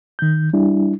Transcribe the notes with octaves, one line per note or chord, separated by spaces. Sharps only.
D#3 G6
G3 D4 E4